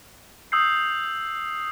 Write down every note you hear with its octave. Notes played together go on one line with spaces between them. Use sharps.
D#6 E6 G6 C7